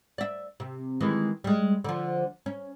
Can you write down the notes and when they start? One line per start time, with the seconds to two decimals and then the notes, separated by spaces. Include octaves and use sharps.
0.18 D5 E5
0.60 C3
1.01 D#3 E3 G#3
1.44 G3 G#3
1.84 D3 F3
2.46 C#4